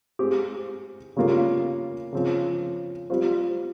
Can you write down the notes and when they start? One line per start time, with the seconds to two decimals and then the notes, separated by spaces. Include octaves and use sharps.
0.19 G#3 C4 G4
1.16 C#3 G3 A#3 F4 A#4
2.13 C#3 F3 C4
3.10 G3 C4 F4 C5